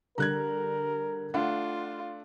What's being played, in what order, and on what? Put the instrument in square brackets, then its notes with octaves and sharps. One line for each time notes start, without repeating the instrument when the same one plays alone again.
[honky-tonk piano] D3 G3 [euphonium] A#4 [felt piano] A#5 F#6 G#6
[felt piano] A3 D4 [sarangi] F4 [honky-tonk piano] F#5